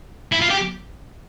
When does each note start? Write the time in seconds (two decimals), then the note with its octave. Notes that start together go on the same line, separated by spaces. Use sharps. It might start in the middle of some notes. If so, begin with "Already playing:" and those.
0.32 E4
0.41 F4
0.50 G4